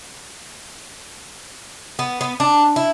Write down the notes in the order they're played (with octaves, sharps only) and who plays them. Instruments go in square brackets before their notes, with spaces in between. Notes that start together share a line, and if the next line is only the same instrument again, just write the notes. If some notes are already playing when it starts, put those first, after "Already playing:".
[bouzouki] B3
B3
D4
E4